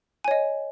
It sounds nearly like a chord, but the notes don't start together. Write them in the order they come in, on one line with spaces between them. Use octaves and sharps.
G#5 C#5 D#5